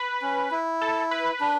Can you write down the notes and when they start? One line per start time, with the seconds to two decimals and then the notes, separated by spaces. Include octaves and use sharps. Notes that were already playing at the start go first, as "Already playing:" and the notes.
Already playing: B4
0.22 C#4
0.51 E4
0.81 A4
1.11 B4
1.41 D4